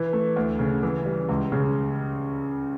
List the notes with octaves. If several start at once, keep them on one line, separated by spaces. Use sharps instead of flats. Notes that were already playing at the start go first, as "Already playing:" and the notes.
Already playing: E3
A3
D2
C#3
E3
G3
C#2
C#3